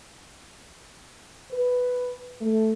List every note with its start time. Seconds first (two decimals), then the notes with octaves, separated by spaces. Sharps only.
1.51 B4
2.41 A3